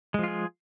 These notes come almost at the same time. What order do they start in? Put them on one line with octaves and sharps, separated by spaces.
G#3 F3 F4 G#4